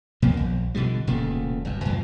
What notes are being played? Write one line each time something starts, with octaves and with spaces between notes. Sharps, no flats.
D#2 B2 F3 A#3
A#1
B2 D3 F3 G3
E1 A#2 C#3 A3
G1 F#2
E2 G2 B2 F3